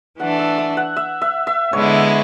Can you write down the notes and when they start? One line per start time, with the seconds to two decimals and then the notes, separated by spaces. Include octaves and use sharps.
0.19 E3 A3 D4 F#5
0.39 E5
0.58 E5
0.77 F#5
0.96 E5
1.21 E5
1.47 E5
1.73 D3 G#3 B3 E4 C#5